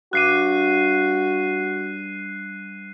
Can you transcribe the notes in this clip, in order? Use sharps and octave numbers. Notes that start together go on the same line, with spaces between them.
G2 F#4 F#6 C7 D#7